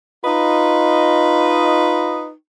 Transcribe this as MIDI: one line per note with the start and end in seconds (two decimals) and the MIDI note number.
0.25 2.30 63
0.25 2.30 65
0.25 2.30 71
0.25 2.30 75